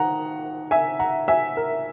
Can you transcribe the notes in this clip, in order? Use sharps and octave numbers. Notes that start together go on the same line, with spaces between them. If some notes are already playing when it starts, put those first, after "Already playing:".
Already playing: D#3 F#5 A#5
E5 G#5
F#5 A#5
E5 G#5
A#4